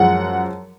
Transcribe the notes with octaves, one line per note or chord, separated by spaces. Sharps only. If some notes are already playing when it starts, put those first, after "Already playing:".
Already playing: F#2 F3 G#3 F#5